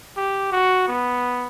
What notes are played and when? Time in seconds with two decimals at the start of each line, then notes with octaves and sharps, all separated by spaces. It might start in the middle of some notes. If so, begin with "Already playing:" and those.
0.17 G4
0.52 F#4
0.88 B3